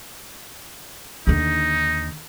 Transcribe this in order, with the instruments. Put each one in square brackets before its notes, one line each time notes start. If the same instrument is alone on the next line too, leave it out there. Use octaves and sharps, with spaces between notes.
[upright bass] D#2 D3 [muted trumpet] D#4